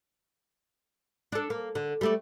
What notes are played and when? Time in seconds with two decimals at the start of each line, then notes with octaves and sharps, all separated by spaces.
1.32 D4 A4
1.50 A#3
1.75 D3
2.01 G3 A3 D5